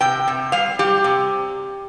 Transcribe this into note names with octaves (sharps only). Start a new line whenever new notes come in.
C3 G5
C3
G3 F5
G3 G4
C3